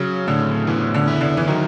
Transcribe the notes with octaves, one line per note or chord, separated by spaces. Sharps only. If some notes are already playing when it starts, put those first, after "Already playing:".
Already playing: C#3 F#3
A2 D3
E3 B3
D3
E4
D3
E3
D#3 F#3